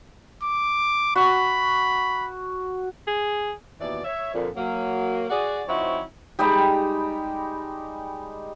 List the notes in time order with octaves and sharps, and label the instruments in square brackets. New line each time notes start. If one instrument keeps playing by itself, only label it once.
[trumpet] D6
[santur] F#4 [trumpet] B5
[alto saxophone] G#4
[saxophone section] D#2 B2 E3 D5
C#5 E5
F2 A#2 D3
F#3 A#3
F#4 G#4 D5
F3 C4 D#4 E4 F#4 C#5
[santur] G3 G#3 D#4 G4